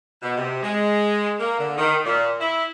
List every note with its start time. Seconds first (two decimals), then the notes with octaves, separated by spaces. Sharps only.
0.22 B2
0.37 C3
0.62 G#3
1.40 A#3
1.59 D3
1.78 D#3
2.05 A#2
2.40 E4